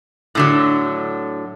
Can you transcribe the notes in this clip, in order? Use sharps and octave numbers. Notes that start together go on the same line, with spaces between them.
A2 D3 F#3